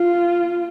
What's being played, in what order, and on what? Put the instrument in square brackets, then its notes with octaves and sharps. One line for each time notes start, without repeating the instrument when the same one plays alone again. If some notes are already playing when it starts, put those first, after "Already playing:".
Already playing: [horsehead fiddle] F4